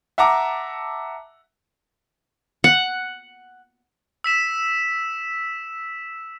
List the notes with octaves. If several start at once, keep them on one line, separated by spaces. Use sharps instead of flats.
E5 F#5 A5 A#5 D6
F#5
E6 B6 E7